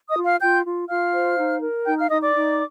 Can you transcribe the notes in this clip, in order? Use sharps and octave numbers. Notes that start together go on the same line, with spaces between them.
D#5 D#6
F4
F5 F6
F4 G5 G6
F4
F4 F5 F6
C5
D#4
A#4
D#4 G5 G6
F5 F6
D#4 D#5 D#6
D5 D6
D#4